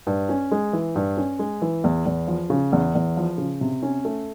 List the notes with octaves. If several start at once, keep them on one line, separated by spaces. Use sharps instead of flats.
G2
C#4
G#3
E3
G2
C#4
G#3
E3
E2
E2
F3
C#3
E2
E2
F3
C#3
C3
C#4
A3